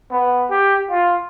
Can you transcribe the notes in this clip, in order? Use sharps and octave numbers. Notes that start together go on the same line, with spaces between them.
B3
G4
F4